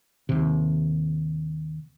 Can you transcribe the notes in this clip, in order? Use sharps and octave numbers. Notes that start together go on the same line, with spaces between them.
D#2 C3